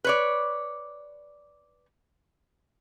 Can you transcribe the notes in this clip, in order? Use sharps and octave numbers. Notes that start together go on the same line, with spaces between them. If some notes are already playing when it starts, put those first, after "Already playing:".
B4 C#5 D5